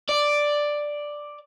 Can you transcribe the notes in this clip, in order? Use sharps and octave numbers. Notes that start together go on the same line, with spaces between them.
D5